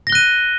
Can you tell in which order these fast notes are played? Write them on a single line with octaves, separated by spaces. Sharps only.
A#6 G7 F#6 D#7